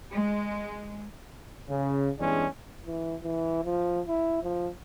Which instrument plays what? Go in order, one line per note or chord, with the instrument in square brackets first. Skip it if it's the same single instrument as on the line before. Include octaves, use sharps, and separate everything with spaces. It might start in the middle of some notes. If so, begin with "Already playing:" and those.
[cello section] G#3
[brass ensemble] C#3
E2 G2 E3 G#3 C#4 D4
[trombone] E3
E3
F3
E4
F3